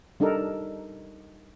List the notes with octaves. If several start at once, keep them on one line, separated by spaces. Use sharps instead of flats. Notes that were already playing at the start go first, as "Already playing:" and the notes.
G3 D4 D#4 A4 A#4